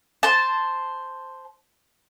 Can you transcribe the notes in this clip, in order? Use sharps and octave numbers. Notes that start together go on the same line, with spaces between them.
C5 A5